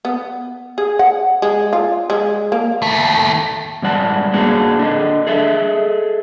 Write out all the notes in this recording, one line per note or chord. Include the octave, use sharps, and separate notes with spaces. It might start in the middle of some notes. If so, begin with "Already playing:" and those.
B3
G#4
F#5
G#3
F4
G#3
A#3
D#2 A3
G#2 G3 D5 F#5 A5
A#3 D4 F#4 G#4 F#5 A5
D4 A4 D#5
G#4 A4 D#5 E5